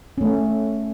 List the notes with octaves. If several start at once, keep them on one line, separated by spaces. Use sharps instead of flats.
A3 C#4